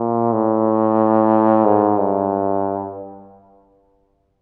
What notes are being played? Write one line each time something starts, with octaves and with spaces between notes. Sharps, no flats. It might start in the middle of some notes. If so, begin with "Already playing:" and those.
Already playing: A#2
A2
G#2
G2